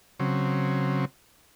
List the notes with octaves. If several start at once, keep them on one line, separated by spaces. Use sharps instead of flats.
C#3 F#3 C4